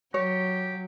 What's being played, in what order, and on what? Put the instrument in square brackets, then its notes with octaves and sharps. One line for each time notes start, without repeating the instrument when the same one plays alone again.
[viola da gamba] F#3 [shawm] G4 [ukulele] C#5